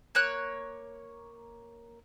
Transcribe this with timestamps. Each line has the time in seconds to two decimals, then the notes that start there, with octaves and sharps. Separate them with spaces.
0.15 A#3 C#5 F#6